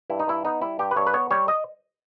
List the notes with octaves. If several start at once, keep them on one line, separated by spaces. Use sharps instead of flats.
G2 E4
D#4
G2 E4
B3 D#4
G3 E4
G2 G4
B4
G2 C#5
B4
B3 C#5
G3 C#5
D#5